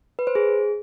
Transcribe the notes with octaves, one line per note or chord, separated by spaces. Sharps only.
B4
C5
G#4